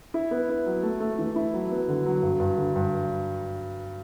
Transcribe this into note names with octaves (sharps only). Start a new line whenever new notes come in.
E4
B3
E4
F#3
A3
A3
E3
E4
F#3
B3
D3
F#3
G2
G2
D3
G2